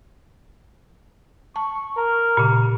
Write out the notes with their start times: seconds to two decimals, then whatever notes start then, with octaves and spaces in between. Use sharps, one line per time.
1.56 A5 C#6
1.97 A#4
2.37 A#2 C#3